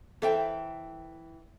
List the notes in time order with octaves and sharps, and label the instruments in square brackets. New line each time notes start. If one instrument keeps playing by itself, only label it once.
[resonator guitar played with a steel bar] E3 E5 G5 [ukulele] A4 C5